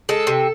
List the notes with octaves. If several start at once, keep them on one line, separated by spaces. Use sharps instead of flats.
G#3 A4
C3